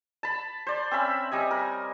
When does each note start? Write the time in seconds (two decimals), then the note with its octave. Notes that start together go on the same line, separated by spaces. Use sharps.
0.23 A5 B5
0.67 C5 D5
0.91 C4 C#4 E5 B5
1.32 G3 D#5 G#5
1.51 A#4